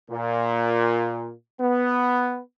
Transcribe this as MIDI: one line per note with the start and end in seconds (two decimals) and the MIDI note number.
0.11 1.32 46
1.61 2.39 59